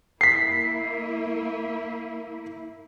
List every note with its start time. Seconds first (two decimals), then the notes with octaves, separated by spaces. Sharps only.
0.21 A#3 E4 B6 C7